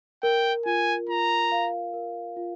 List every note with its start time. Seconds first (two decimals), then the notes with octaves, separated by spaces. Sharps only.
0.23 A#4 G5
0.66 F4 G#5
1.08 F4 A#5
1.52 F5
1.94 A#4
2.37 F4